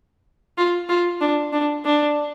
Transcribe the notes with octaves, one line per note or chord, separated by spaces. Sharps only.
F4
F4
D4
D4
D4